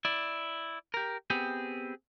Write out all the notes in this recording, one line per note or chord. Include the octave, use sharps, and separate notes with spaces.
E4 D5
G4 A#4
B3 C4 G4 G#4